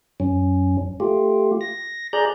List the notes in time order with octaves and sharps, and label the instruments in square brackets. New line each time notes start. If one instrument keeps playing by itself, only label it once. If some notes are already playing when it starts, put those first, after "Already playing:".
[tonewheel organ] F#2 C#4
A3 F4 G4
A#6
G#4 D5 A#5 F#6 G6